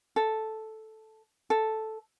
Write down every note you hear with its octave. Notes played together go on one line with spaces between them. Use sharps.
A4
A4